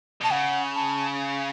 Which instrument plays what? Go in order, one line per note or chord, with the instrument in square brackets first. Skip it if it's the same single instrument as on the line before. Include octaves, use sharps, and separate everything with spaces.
[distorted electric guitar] B2 [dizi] A5
[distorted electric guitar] C#3 [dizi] F#5
[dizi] A5